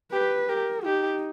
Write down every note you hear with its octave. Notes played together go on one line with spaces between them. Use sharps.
G4 B4
G4 A#4
D#4 G4